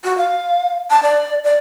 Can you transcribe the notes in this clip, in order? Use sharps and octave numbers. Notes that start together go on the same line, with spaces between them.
F#4
F5
A5
D5
D5